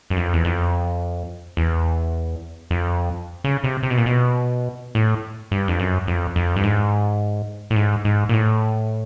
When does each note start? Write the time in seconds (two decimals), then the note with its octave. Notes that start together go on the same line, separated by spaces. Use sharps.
0.10 F#2
0.17 F2
0.33 E2
0.45 F2
1.57 E2
2.71 F2
3.44 C#3
3.64 C3
3.83 C3
3.90 B2
3.98 A#2
4.06 B2
4.95 A2
5.52 G2
5.68 F2
5.79 F#2
6.07 F2
6.36 F2
6.56 G2
6.64 G#2
7.70 A2
7.76 G#2
8.05 G#2
8.29 A#2
8.33 A2